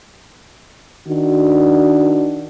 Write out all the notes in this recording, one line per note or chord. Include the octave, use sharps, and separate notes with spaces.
D#3 D4 F#4